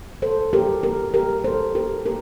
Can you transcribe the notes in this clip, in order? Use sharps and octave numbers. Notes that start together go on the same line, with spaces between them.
A4 C5
G4 A#4
G4 A#4
G4 A#4
A4 C5
G4 A#4
G4 A#4